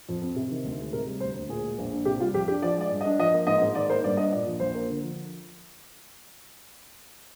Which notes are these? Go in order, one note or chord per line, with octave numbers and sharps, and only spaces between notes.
F2
C4
C3
D#3
D2
G#3
C3 A#4
G3
D2 C5
D2
A#2 G#4
G#3
A#1
D4
C3 G4
G3 F4
F2 G4
D4 G4
F3 D5
G#3 D5
G2
D#5
D4
F3 D#5
A#3
G#2 D#5
G#2
D#3 D5
A#3 C5
G2 D5
D4 D#5
A#2 D5
F3
A#1 C5
A#3
D3
F3